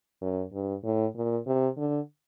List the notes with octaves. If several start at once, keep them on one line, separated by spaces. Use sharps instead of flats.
F#2
G2
A2
A#2
C3
D3